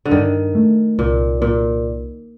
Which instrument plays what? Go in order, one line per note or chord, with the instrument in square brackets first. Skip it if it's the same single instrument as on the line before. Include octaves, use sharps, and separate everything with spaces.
[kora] D3
[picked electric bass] G2 [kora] D#3
[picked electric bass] A3
[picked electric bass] C2 [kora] A#2
[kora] A#2 [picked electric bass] A#3